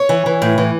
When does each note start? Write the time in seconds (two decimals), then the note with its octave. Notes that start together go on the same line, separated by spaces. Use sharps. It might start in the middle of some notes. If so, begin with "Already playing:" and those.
Already playing: C#5
0.09 E3
0.26 E3
0.42 A2
0.58 E3